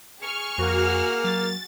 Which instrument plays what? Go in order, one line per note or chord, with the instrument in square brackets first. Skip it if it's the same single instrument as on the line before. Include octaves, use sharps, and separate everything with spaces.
[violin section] G#4 F6 [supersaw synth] C#6
[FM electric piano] F2 [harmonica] A#3 [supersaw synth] F#4
[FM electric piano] F#3 [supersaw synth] A6